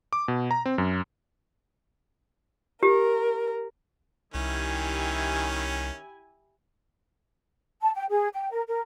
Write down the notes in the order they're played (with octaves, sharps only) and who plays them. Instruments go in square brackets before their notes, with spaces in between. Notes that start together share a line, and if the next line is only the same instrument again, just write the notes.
[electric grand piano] D6
B2
A#5
C4
F#2
[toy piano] G4 [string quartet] A#4
[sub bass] C2 [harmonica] D#3 C#4 [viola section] E4 G4 G#5
[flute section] A5
G5
G#4
G5
A#4
A#4